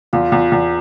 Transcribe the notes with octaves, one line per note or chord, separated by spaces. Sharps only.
E2 F4
E2
E2